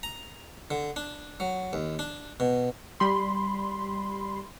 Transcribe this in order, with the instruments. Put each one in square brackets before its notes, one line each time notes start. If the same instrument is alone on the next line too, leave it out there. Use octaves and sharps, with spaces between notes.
[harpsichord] A#5
D3
D4
F#3
D#2
D4
B2
[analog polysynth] G3 B5 C6